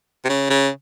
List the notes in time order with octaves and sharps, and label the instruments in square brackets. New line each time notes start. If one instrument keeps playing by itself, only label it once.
[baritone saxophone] C3
C#3
C#3